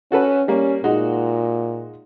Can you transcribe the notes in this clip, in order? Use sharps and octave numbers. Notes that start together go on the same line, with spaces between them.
C#4 F#4 A4 B4
G3 A#3 C#4
A#2 G#3 D#4 F#4